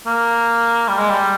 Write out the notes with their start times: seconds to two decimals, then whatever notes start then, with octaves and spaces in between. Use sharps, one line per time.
0.07 A#3
0.89 G3
0.99 G#3
1.10 G3